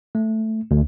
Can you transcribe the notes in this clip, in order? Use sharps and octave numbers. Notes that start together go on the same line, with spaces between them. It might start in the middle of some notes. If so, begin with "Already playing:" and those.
A3
D2